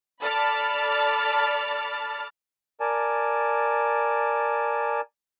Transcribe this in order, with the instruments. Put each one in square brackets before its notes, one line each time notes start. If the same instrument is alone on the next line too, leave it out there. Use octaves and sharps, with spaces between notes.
[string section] A4 D5 A5 B5 F6 A6
[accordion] A#4 D5 G#5 A5